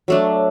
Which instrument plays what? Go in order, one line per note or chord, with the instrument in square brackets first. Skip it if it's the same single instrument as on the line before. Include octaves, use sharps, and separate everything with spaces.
[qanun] F#3 A3 D4